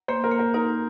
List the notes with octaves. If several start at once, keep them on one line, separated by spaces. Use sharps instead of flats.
A#3 C5
A#4
A#3
A#4
D#4 A#4